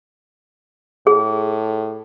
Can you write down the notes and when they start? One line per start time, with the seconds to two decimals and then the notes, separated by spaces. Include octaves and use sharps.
1.07 A2 G#4